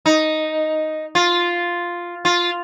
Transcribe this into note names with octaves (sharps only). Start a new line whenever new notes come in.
D#4
F4
F4